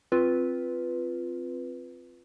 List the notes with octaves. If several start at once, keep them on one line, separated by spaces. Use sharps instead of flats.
C4 F4 B4